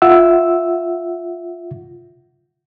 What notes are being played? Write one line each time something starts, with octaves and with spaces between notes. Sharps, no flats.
F4 E5 F#5 E6